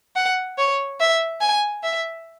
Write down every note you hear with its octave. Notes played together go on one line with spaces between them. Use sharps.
F#5
C#5
E5
G#5
E5